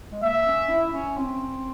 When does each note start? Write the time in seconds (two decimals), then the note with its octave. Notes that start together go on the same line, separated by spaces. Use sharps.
0.12 G#3
0.23 A#3 E5
0.46 C#4
0.69 E4
0.93 C#4
1.17 C4